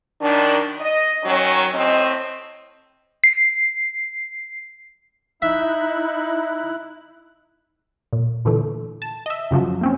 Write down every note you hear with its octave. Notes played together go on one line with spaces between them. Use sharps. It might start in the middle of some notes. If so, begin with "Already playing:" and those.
F#2 D#3 D4
D#5
D#3 F#3 C#4
A2 C4 D#5
C7
D#4 E4 E5 F#6
A#2
A#2 D3 E3 A3
A5
D#5 E5
F#2 C#3 F3 F#3
A#3 C4 C#4